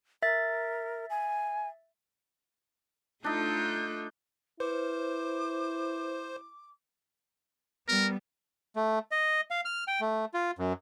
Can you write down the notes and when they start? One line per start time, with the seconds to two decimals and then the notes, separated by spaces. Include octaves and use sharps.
0.23 A#4 E5 A6
1.10 G#5
3.24 A3 D4 D#4 F4 A4 G6
4.60 E4 B4 C5 D6
7.88 G3 B3 A#4
8.76 A3
9.11 D#5
9.50 F5
9.65 F6
9.88 G5
10.01 A3
10.34 F4
10.59 F#2